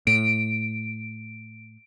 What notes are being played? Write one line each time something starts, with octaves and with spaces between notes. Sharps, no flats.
A2 D7